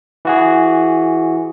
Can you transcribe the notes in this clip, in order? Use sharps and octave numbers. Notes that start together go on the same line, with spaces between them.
E3 F#4 G#4